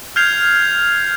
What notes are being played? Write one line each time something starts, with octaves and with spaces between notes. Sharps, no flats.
F6 G6 G#6 C7 F7